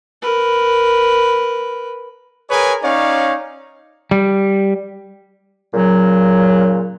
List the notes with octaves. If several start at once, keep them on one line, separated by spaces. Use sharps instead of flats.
A#4 B4
G#4 A#4 B4 C#5 G#5
C#4 D#4 C#5 D5 F5
G3
A#2 C#3 F#3